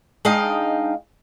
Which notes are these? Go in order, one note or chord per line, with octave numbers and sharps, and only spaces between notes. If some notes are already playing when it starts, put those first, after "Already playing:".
G#3 D4 D#4 D#5 F5 G5